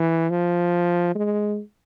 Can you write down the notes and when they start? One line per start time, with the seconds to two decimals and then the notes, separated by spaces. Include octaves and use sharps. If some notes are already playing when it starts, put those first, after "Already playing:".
Already playing: E3
0.30 F3
1.15 G#3